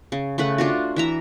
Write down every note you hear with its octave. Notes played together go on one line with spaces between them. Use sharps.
C#3
C#3 A3 B4 F#5
D4 F4 F#4
E3 E5 A#5